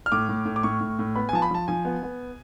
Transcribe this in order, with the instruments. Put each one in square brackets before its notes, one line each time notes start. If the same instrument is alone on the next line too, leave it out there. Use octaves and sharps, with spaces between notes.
[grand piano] F6
A2 D6
A2
A2
D6
A2 C#6
A2
A2
B3 B5
G#5
F3 A5
B5
F3 A5
F3 G#5
B3
B3